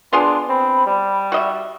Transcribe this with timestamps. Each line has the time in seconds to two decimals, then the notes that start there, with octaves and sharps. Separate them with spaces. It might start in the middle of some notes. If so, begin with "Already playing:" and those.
0.13 B3 D4 F4 G#4 C6
0.49 C4 B5
0.86 G3
1.32 F#4 D#5 E5